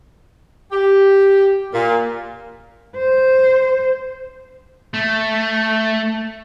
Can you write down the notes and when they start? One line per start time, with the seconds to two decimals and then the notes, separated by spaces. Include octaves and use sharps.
0.71 G4
1.73 A#2
2.98 C5
4.94 A3